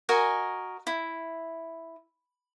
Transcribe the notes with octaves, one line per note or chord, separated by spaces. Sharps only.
F#4 A#4 D#5 G#5
E4